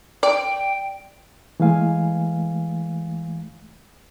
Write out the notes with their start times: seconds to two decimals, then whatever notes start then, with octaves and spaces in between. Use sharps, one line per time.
0.23 D5 G5
1.60 E3 G#3 A3 F5 G#5